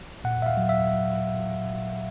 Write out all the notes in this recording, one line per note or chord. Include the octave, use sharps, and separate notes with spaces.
A#2 F#5
E5
F5
F#3
E5
F#3